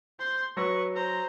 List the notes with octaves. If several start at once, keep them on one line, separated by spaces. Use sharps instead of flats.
C5 C6
F#3 B4 C#6 E6 A#6
C5 A#5